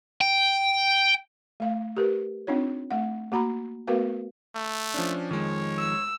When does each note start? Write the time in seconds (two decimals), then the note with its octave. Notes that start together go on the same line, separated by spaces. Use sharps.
0.21 G5
1.60 A3 F5
1.97 G4 A#4 B4
2.47 C4 D4 D#4 F4 C#5
2.91 A3 F#5
3.32 A#3 F#4 A#5 B5
3.87 A3 B3 F#4 A#4 B4 F5
4.55 A3
4.94 F3 C#4 D4
5.31 F2 D#3 F3 G#3 C#5
5.79 E6